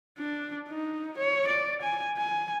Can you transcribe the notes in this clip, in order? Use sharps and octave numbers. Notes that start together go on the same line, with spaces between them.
D4
D#4
C#5
D5
G#5
G#5